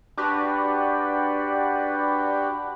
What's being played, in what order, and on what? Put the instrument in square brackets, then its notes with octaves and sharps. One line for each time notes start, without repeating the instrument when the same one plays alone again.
[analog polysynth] D4 F#4 G4 B4